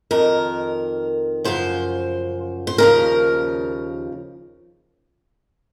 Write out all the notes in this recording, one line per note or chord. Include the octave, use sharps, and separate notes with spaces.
F2 D#3 A#4
F#2 C#3 F3 C5
C5
D#2 C#3 F3 A#4